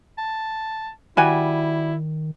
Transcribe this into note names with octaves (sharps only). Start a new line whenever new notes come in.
A5
D#3 G3 E4 F#4 G#5